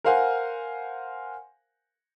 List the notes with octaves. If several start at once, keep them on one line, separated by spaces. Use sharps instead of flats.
A#4 C5 F5 F#5 G#5